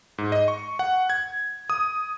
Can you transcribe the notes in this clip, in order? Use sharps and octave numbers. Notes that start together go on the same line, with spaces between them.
G#2
D#5
C#6
F#5
G#6
D#6